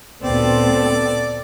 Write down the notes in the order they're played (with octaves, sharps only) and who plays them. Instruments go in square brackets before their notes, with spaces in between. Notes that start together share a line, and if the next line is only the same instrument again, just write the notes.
[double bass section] D2 A#2 C4 [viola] B3 A4 [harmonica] D5